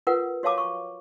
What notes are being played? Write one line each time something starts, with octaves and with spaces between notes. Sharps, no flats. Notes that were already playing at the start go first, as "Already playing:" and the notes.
F4 A#4 B4 F#5
F#4 C#5 F5 A5 D6
C#6